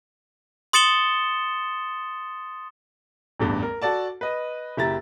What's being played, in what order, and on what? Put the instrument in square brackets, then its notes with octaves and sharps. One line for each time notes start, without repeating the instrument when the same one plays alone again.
[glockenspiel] C6 D#6 A6 C#7 E7 G7
[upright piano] A1 E2 G2
A#4
F#4 A4 D5 A5
B4 D#5
F#1 E4 G4 A#5 A6